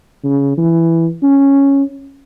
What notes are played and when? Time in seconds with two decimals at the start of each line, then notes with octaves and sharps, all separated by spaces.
0.24 C#3
0.57 E3
1.23 C#4